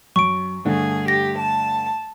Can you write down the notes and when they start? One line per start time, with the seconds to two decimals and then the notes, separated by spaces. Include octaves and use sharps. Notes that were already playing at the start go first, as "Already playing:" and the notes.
0.16 F#2 C#6 D7
0.65 G2 D3 A3 G#4
1.08 G4 A#6
1.39 A5